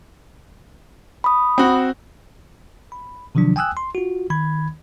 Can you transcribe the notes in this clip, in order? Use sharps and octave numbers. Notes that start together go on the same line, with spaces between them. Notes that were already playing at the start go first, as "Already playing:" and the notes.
B5 D#6
C4 F#4
B5
C3 D#3 F3 F#3 D4
G5 G#5 D#6 E6 F#6
C6
F4 F#4
D#3 B5 G#6